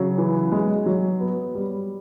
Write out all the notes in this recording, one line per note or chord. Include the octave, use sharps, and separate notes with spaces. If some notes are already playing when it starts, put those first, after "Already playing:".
Already playing: C#3 F#3
E3
G#3
F#3
B3
G3